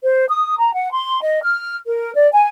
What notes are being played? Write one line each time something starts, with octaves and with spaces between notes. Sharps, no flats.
C5
D#6
A#5
F#5
C6
D#5
F6
A#4
D5
G#5